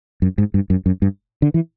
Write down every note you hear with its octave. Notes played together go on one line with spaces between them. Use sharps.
F#2
G#2
G2
F#2
F#2
G2
D3
E3